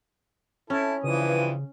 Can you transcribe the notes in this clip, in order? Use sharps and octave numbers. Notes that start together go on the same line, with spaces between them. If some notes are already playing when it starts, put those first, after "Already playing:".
C#4 E4 A4
G2 C#3 E3 F3 B4 D#6